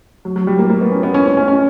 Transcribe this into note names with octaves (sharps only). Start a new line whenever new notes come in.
F#3
F#3
G3
A#3
A#3
B3
C#4
B3
C#4
C#4
C#4
C#4